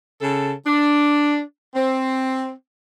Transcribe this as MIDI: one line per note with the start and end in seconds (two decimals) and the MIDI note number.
0.22 0.52 49
0.22 0.52 69
0.67 1.40 62
1.75 2.50 60